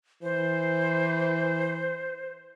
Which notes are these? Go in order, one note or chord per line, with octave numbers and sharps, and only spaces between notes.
E3 C5